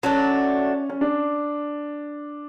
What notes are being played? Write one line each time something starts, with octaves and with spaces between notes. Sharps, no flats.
F#3 A3 C#4 D4
C#4
D4